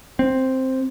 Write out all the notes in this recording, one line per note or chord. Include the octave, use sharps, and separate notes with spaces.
C4